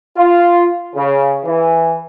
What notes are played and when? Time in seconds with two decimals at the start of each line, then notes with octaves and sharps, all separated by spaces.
0.17 F4
0.95 C#3
1.45 E3